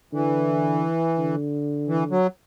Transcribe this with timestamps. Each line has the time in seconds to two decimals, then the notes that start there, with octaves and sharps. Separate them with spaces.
0.13 D3 E3
1.18 D3
1.88 E3
2.11 F#3